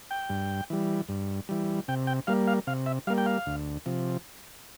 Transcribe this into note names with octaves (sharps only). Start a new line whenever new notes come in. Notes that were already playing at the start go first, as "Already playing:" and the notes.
G5
G2
E3 G3
G2
E3 G3
C3 G5
G5
G3 A#3 F5
F5
C3 F5
E5
G3 A#3 F5
G5
F5
D2
C3 F3